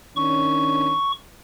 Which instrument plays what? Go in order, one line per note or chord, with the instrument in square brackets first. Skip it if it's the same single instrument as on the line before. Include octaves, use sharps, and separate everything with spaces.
[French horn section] D#3 C#4 D4 [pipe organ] C#6